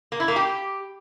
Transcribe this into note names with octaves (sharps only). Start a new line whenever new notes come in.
A#3
E4
A#3
G4